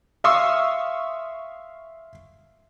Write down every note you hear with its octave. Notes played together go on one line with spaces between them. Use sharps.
E5 F5 C6 C#6 D#6 E6